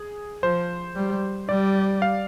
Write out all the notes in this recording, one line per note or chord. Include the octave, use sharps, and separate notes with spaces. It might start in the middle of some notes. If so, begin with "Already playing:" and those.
Already playing: G#4
F3 C5
G3
G3 D5
F5